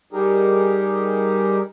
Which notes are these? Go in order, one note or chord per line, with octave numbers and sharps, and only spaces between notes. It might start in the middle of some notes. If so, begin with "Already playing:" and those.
G3 D#4 G4 G#4 A#4